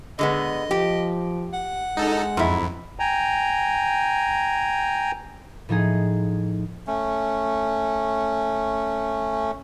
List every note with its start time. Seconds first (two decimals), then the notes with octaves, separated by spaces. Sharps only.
0.19 D3 G#3 B3 D#5
0.71 F3 G4
1.53 F#5
1.97 G#3 D#4 A4
2.37 F2 G#2 E4
2.99 G5 G#5 A#5
5.69 A2 F3 D#4 G#4
6.87 A3 C#4